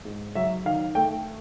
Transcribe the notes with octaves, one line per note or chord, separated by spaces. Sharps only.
G#2
F#3 E5
D#3 F5
A3 G5